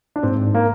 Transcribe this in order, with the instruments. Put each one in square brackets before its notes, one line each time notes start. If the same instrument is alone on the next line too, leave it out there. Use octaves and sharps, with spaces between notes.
[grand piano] D4
[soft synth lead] G#2 [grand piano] C4
[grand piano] A#3